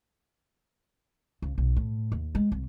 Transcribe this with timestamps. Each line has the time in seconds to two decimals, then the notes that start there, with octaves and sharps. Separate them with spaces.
1.42 C#2
1.58 B1
1.76 A2
2.12 D#2
2.35 G#3
2.52 C2